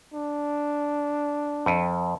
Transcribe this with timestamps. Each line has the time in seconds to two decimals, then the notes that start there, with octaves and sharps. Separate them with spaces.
0.14 D4
1.66 F2